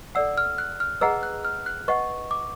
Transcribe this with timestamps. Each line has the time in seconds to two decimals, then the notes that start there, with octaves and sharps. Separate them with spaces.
0.15 A4 D5 F#5 E6
0.38 F6
0.58 F#6
0.80 F6
1.01 G#4 B4 D#5 F#5 A#5 E6
1.23 F#6
1.45 F6
1.66 F#6
1.88 B4 D#5 F#5 C#6
2.31 D6